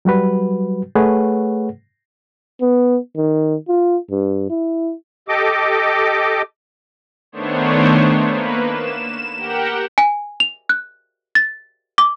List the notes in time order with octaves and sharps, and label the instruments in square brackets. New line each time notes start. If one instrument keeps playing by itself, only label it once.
[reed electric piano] F#3 G3 F#4 B4
A3 G#4 B4 C#5 F#5
[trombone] B3
D#3
F4
G2
E4
[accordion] G4 A4 D#5 D6
[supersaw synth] D#3 A3 B3 D4 C5 C#5
A#3 B4
E7
G4 A#4 F#5 G5
[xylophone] G#5
F7
F#6
A6
D6